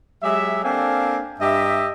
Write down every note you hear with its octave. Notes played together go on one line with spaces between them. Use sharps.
F#3 G#3 G4 E5
A#3 C4 D4 A4 F5 G#5
G2 G4 D#5 E5